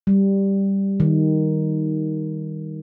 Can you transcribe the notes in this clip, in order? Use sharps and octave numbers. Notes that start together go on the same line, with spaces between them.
G3
D#3